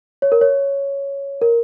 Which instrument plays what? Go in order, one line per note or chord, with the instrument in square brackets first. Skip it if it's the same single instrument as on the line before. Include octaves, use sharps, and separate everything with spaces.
[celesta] C#5
A#4
C#5
A#4